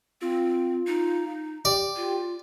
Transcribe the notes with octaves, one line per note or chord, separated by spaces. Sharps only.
C4 F4
D#4
G4 D5
F4